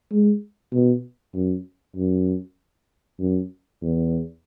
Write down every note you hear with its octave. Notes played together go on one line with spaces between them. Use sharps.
G#3
B2
F#2
F#2
F#2
E2